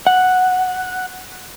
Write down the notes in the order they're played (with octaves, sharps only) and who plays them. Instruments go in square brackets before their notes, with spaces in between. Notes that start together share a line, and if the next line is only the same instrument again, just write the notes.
[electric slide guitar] F#5